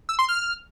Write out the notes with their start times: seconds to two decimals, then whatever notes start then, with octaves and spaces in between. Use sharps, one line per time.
0.09 E6
0.19 C6
0.29 F6